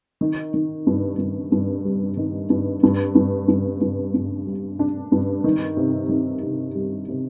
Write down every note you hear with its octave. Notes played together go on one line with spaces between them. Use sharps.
D#3
D#3
G2
G2
G2
G3
D#3
G2
G2
G2
G2
G2
G2
G3
D4
G2
D#3
C3
D#3
C3
G3
C3